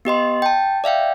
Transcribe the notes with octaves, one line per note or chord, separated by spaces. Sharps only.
B3 G4 D#5 C6
G5 A5
D5 E5 F5 G5